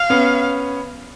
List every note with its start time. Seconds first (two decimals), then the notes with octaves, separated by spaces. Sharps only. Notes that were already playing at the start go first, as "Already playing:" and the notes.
Already playing: F5
0.10 B3 C#4